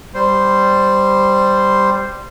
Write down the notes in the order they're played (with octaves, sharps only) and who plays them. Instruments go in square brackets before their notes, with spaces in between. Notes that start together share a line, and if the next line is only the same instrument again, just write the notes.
[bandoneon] G3 C5